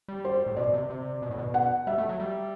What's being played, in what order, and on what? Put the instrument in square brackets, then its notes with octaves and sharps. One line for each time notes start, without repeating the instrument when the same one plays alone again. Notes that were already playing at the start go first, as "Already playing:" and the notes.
[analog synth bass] G3
[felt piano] C5
[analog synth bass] A2
[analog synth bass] B2 [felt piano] D5
[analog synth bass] C3
C3
B2
A2
B2
[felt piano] F#5
[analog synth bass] G3 [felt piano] E5
[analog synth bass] A3
F#3
G3